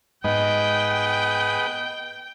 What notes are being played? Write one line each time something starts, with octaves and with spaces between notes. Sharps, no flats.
G#2 B3 G#4 B4 D#5 G5